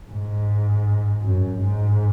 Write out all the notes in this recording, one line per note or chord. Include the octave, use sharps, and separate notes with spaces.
G#2
F#2
G#2